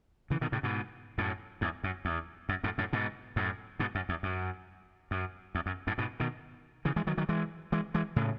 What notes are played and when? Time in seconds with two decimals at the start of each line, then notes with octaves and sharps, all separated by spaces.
0.30 C#3 E3
0.41 B2 D#3
0.52 A2 C#3
0.63 G#2 B2
1.18 F#2 A2
1.61 E2 G#2
1.84 F#2
2.05 E2
2.49 F#2
2.64 F#2 A2
2.78 F#2 A2
2.93 G#2 B2
3.36 F#2 A2
3.79 G#2 B2
3.95 F#2
4.09 E2
4.23 F#2
5.11 F#2
5.55 E2
5.66 F#2
5.87 F#2 A2
5.98 G#2 B2
6.20 B2 D#3
6.85 C#3 E3
6.96 E3 G#3
7.07 D#3 F#3
7.18 D#3 F#3
7.29 E3 G#3
7.72 E3 G#3
7.94 E3 G#3
8.16 A2 C#3